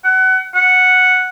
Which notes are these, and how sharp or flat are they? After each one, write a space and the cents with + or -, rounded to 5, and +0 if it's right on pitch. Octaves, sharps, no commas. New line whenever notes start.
F#5 +25
F#5 -5